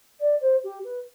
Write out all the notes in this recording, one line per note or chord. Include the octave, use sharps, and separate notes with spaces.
D5
C5
G4
B4